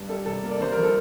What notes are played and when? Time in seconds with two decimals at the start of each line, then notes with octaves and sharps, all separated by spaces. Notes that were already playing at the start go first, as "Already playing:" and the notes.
Already playing: G2
0.09 G3 A4
0.26 C3 A4
0.43 A#3
0.51 D5
0.60 G2 C5
0.72 F3 A#4
0.83 A4